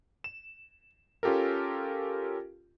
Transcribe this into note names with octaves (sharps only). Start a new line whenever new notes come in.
E7
C#4 F4 G4 A4 A#4